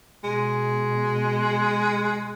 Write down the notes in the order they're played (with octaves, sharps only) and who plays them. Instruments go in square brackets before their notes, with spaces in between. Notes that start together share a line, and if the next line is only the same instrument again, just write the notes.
[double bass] B2 [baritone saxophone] G#3